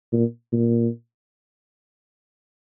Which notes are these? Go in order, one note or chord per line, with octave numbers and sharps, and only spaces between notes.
A#2
A#2